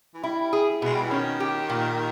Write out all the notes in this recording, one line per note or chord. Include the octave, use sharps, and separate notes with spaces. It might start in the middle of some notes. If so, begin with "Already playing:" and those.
E3
G3 E4
G#4
B2 G#3
G3
E3
D#3 C#4
G4
A#2